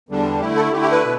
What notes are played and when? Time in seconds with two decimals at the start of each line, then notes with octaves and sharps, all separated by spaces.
0.09 E2 D3 G3 D4
0.40 D3 A3 E4 G4
0.56 A4
0.72 D3 A3 E4 G4
0.82 G4
0.92 B4
1.04 B2